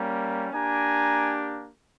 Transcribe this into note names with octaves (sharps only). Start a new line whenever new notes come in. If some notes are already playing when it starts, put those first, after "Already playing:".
Already playing: G3 A#3 C#4
A#3 D4 G4 G#5 A#5